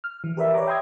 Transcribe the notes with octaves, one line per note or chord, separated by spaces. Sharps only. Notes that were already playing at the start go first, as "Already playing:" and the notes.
F6
E3
G4 A#4 B4 D5 E5 B5
B4 C#5 D5 A#5 D6
E5 G5 A#5 C6 D#6 G#6